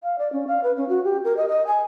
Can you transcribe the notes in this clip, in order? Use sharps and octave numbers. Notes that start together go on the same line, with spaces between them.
F5
D5
C#4
F5
B4
C#4
F#4
G4
A#4
D#5
D#5
G#5